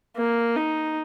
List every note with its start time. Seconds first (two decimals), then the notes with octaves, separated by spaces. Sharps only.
0.17 A#3
0.56 D#4